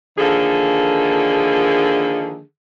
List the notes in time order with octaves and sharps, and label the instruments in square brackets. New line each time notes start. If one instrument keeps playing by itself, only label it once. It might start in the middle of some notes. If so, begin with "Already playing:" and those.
[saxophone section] D3 D#3 F3 A#3 G#4 A4